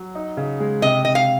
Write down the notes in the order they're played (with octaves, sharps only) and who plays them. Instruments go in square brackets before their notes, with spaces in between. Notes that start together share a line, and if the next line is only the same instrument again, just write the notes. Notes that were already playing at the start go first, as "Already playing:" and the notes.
Already playing: [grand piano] F#3
D#4
C#3
G#3
[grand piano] C3 [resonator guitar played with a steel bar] D#5
[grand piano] C3 [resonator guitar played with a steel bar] D#5
[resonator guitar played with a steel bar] F5